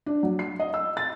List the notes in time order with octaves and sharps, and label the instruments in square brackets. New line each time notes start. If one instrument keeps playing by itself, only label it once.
[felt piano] D4
F#3
C7
D#5
E6
A6